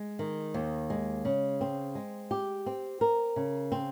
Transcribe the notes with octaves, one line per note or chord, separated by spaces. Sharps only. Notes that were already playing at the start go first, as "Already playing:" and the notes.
Already playing: G#3
D#3
D#2
G#3
C#3
C4
G#3
G4
C4
A#4
C#3
C4